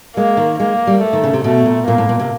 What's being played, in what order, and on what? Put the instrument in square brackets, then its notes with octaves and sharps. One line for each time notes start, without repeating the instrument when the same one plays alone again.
[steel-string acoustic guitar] G#3 [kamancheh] A#3
[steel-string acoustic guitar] D#3
[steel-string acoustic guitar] G#3 [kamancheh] A#3
[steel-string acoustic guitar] G3
[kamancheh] A3
[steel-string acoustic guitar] D#3
C#3
C3
[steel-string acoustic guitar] B2 [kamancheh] A3
[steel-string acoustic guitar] A#2
[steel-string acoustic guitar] A#2 [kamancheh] A#3
[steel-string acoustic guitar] A2
A#2
C3